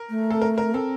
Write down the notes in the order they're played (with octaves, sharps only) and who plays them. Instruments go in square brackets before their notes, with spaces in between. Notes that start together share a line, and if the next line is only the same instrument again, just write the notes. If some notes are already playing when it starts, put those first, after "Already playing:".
Already playing: [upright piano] A#4
[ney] A3
[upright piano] A4
A#4
A#4
[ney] C4 [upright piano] A4